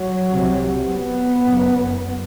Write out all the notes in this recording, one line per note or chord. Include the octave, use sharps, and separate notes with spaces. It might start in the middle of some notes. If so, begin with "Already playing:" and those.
Already playing: F#3
C2 C3
B3
F#1 F#2